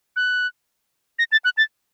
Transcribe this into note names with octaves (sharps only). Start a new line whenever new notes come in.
F#6
A#6
A6
F#6
A6